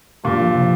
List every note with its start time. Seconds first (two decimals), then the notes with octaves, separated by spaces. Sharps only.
0.24 G2 A#2 A#3
0.40 F3
0.54 C3